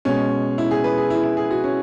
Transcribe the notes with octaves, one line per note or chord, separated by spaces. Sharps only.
B2 G#3 C#4
E4
G#4
B4
G#4
E4
E4
G#4
F#4
C#4